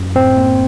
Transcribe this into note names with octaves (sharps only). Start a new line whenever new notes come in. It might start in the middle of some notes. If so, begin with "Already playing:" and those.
Already playing: F#2
A2 C4
A#3